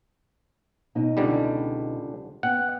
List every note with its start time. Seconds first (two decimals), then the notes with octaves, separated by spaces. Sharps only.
0.95 B2 D#4 D#5
1.17 C#2 D3 G3
2.43 B3 F#5 G5